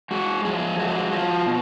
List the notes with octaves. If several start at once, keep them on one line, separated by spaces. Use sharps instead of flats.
G#3 F#4
F3 G#4
G#3 F#4
F3
B2